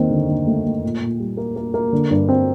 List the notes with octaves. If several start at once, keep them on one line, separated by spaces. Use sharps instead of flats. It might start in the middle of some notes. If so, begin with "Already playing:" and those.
Already playing: D#2 D#3 C4
D3
D3
A3
A3
A#2
A#2
G3
A#3
A#3
A#3
D3
G2
C4